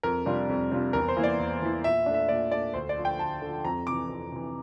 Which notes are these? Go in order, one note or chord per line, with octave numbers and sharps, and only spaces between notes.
F2 A#4
C3 G3 D4 F4
F2
C3 G3 D4 F4
E2 A#4
C5
E3 A#3 E4
D5
E2
E3 A#3 E4
A#2 E5
A3 D4
E5
A#2 D5
A3 D4 D5
D2 C5
D5
D3 F3
G5
D2 A5
D3 F3
F2 A#5
C3 E3 D6
F2
C3 E3